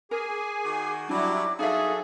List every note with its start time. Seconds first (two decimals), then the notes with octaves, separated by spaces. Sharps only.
0.11 G#4 A#4 G#5 D6
0.65 D#3 F#4
1.09 F#3 G3 D4 E4 D6
1.59 G2 F#3 D#4 G#4 A4 E5 F5